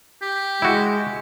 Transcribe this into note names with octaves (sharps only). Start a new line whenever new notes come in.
G4
G#3 E4 F#4